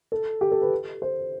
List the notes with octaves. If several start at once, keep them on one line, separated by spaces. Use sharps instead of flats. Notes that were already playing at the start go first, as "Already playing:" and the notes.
A4
G4
A4
B4
C5